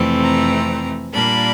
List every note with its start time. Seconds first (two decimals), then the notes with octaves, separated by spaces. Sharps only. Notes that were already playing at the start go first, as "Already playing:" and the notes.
Already playing: F2 C3 E3 A3 C4
0.21 A#5
1.13 A#2 G3 A#3 D4 B5